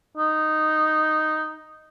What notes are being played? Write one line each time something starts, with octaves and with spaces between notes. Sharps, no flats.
D#4